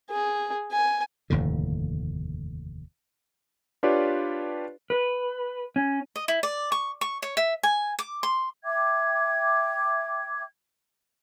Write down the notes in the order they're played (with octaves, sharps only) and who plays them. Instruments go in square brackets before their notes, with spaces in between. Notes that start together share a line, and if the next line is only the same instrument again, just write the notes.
[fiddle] G#4
G#5
[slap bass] F1 D#2 A2 D3
[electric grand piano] D4 F4 G4 B4 C#5 D5
[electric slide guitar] B4
C#4
[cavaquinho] D#5
E4
D5
C#6
C#6
C#5
E5
G#5
D6
C6
[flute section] E5 G5 D6 G#6